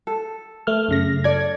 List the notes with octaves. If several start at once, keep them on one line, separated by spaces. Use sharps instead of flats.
A4
A3 F6
F#2 C#3 A#6
A4 D5 G#6